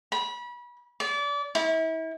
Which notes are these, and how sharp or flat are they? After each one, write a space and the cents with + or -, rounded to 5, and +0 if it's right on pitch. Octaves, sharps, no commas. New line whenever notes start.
B5 -30
D5 -30
E4 -35